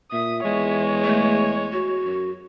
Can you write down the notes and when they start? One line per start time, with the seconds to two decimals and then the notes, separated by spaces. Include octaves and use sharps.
0.12 A#2 E5 D#6
0.45 E2 G#3 C#5
1.04 A3
1.72 F#4
2.05 F#2